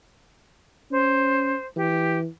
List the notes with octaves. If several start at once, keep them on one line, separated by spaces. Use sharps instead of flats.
C#4 C5
E3 G4